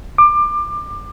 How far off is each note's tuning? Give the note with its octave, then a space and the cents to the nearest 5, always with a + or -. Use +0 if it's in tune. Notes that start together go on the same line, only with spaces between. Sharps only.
D6 +25